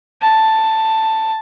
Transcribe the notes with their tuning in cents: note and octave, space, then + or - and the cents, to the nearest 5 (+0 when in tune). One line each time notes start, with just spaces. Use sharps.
A5 +5